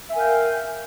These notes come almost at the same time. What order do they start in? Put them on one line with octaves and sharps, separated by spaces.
E5 G#5 A#4 F5 G5